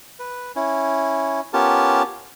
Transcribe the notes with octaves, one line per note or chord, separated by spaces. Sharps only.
B4
C#4 E4
B3 C#4 F4 G4 A#4 A5